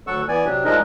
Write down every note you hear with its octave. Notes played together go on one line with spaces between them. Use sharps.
D2 F#3 A4 F#5 C#6 E6
E3 B3 D5 G#5
C3 F#3 D4 G4
F3 G#3 D4 D#4 A#4 D#5